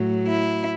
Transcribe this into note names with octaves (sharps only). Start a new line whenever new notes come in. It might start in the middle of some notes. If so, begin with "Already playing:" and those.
Already playing: A2 F#3
E4